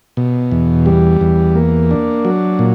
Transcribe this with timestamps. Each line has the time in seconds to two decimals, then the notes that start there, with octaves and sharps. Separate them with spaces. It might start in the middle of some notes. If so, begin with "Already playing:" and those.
0.17 B2
0.51 E2
0.86 G3
1.21 E2
1.55 A#3
1.91 D4
2.25 F#3
2.59 A#2